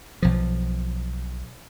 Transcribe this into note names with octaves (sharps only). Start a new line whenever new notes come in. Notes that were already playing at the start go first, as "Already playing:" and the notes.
B1 F3